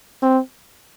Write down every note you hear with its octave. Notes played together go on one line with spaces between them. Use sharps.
C4